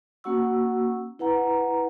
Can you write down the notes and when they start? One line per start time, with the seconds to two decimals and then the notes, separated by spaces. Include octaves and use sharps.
0.24 A#3 C#4 F#4 F#5 C#6 E6
1.19 E4 B4 F#5 A#5